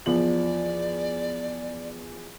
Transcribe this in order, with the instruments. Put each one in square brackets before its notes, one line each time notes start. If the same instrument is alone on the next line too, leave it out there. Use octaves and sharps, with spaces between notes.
[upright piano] E2 F3 F#7 [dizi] D5